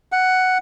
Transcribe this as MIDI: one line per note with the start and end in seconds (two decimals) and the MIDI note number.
0.12 0.58 78